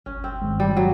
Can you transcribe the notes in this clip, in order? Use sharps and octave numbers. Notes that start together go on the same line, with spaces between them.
G1 C#4
C4
G2 D#3 G#3
G3
F#3